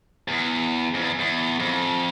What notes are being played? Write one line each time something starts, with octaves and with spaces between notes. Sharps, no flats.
E2
F2
E2
E2
F2